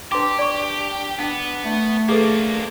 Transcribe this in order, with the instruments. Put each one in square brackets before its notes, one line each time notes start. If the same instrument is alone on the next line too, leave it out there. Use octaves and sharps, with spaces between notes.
[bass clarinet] D4 [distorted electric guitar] G4 [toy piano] B4 C6 D6
[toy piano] D5 C#6
[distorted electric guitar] B3 [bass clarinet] D4
[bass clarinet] A3
[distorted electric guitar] A#3 D4 [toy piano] G#4 A4 B4